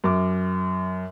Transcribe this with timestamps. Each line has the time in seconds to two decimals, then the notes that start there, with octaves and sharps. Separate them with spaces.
0.04 F#2 D6